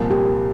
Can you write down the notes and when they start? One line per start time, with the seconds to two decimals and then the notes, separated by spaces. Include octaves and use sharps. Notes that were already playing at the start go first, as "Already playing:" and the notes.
Already playing: C2 A#2 F3 A#3
0.11 G4